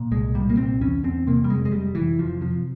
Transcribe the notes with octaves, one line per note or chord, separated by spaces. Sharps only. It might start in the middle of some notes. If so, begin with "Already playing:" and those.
Already playing: A#2
C2 G#3
A#2 G3
A#3
C2 C4
E2 C#4
E2 C4
C3 A#3
G3
F1 G#3
G#3
F1 G3
F1 E3
F2 F3
C3 F3